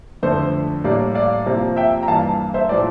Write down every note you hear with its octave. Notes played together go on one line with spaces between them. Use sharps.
F2 D3 A3 C5
A2 G3 A#3 D5
D5 F5
C3 F3 A#3
E5 G5
A#5
G2 E3 A#3 F5 A5
C5 E5
A#2 F3 A3 D5